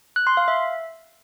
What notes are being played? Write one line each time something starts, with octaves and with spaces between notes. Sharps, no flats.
F#6
C6
F5
E5